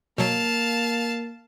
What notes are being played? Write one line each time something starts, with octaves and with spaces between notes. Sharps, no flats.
B2 F#3 A#3 F5 A5